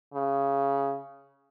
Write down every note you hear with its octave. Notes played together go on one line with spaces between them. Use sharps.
C#3